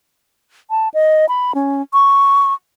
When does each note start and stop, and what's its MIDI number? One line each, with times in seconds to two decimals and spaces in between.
0.70 0.89 81
0.94 1.26 75
1.29 1.52 83
1.55 1.82 61
1.93 2.54 85